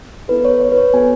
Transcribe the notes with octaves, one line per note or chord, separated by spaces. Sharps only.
B3 E4 A4 B4
C#5
C#5
B4
C#5
B3 F#4 A4 G#5